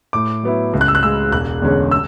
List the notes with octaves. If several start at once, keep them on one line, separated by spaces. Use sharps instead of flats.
A2 D6
F#3 B3 E4
C#2
F#6
E6
F#6
C#3 G#3 E6
E1 F#6
E2 D3 G#3 C#4
E6